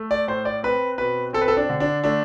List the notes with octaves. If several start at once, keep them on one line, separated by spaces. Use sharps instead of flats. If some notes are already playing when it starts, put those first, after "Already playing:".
Already playing: A3
D5
A2 C5
D5
C4 B4
B2 B4
C4 A4
B4
A4
D4
D3
D4
A3 D4